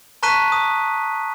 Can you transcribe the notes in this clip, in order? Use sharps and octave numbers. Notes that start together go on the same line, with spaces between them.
A5 A#5 C#6 F#6 B6 D#7
D#6